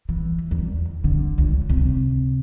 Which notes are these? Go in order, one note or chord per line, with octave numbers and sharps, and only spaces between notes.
E3
E2
D3
C#2
C3